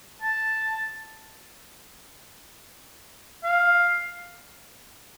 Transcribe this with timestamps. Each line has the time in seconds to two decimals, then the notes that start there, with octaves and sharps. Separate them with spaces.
0.22 A5
3.44 F5